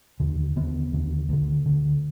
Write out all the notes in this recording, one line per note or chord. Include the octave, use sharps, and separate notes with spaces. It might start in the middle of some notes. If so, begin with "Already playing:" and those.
D#2 D3
D#2 D3 B3
D#2 D3
D2 D3
D2 D3